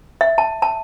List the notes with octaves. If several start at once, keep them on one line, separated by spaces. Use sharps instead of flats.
E5
A5
A5